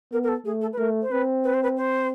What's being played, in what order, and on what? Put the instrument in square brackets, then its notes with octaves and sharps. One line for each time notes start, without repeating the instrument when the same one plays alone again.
[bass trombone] B3 [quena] A#4
[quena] A#4
A4
[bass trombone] A3 [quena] G#4
[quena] A4
B4
[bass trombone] A3 [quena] A#4
[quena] C5
[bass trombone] C4 [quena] B4
[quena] B4
C5
B4
C5